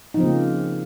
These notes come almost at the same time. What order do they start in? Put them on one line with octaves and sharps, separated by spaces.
D#4 F3 C4 C#3 A#3